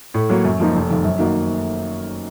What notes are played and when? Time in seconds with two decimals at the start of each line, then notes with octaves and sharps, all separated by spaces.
0.14 A2
0.30 F#3 A#3
0.44 F#2
0.60 F3 A#3 D#4
0.75 F1
0.90 F2 D#3
1.04 F#2
1.19 D#3 A#3 D#4 F#4